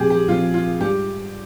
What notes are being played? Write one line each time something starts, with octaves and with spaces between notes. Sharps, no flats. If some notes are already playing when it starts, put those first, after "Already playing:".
Already playing: A#2 F3 C4 G4 G#4
G4
A#2 F3 C4 F4
F4
G#2 G3 D4 F4 G4